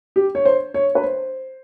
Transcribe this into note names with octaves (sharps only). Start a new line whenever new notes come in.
G4
C#5
C5
C#5
B4
C5